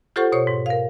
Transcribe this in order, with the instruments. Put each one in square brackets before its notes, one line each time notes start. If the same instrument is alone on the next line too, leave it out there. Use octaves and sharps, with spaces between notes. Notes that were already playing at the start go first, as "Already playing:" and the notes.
[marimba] F4 G4 A4 C5 F#5 C#6
B2 C5 C#5 C#6
G#2
A#4 F5